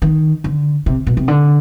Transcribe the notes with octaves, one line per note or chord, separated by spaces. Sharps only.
D#3
D3
C3
B2
C3
D3